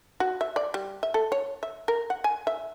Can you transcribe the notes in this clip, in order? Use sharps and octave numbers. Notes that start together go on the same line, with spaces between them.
F#4
E5
D5
G3
E5
A4
C#5
E5
A#4
F#5
G#5
E5